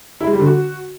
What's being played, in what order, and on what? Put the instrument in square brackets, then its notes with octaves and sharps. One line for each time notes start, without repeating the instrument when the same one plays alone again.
[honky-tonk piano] E4
G#3
G3
D3
F#4